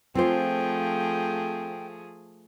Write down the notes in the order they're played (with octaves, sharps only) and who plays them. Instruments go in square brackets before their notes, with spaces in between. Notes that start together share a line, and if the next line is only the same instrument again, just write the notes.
[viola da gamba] F3 A3 G#4 [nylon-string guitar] C4 F4 C5 [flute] G5